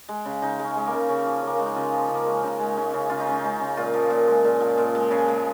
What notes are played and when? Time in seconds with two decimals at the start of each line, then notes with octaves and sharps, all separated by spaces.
0.09 G#3
0.25 C#3
0.42 C#3 D#4
0.59 G#3
0.64 C#4
0.76 G#3
0.87 A#3
0.93 C#3
1.09 C#3 C#4
1.26 F3
1.42 C#3 A#3
1.57 G#3 C#4
1.66 D#4
1.76 C#3 F4
1.93 F3
2.09 C#3
2.15 A#3
2.26 G#3 C#4
2.43 C#3 D#4
2.59 G#3
2.77 G#3 C#4
2.94 C#3
3.10 C#3 F4
3.20 D#4
3.27 G#3 C#4
3.39 G#3 D#4
3.60 C#3
3.77 A#2 F4
3.94 F3
4.10 A#2
4.27 G#3
4.44 A#2
4.60 F3
4.78 A#2
4.95 G#3
5.11 C#3 G#4
5.28 G#3